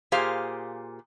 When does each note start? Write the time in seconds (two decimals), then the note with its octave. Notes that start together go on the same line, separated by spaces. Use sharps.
0.12 A#2 G4 G#4 C5 F5